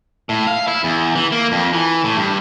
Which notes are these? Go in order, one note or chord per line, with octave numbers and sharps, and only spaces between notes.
A2
F5
E4
E2
E3
A#3
F2
E3
A2
G2